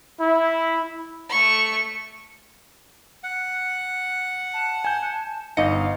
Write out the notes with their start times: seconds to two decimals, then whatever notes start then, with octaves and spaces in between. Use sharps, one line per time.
0.20 E4
1.29 A3 C#6
3.24 F#5
4.53 A5
4.85 G#5 G6
5.57 G1 D#4 D#5 F5 C#7